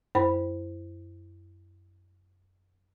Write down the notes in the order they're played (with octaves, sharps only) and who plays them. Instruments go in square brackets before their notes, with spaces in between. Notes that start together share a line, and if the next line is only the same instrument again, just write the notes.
[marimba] F#2 C5 B5